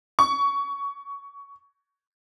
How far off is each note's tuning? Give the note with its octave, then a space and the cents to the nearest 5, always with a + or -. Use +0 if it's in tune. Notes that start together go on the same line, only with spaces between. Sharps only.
C#6 +15